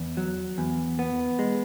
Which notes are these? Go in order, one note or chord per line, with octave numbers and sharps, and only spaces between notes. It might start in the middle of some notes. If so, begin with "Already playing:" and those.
Already playing: E2
F#3
E2
B3
G#3